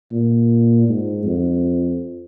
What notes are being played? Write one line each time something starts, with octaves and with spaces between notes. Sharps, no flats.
A#2
G#2
F2